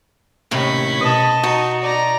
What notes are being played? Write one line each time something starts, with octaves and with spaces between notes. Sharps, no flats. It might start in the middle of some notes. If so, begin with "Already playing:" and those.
D#2 A2 C3 C#4 B5
B2 D#5 A5
D#4 F#4
D#4 D5 A#5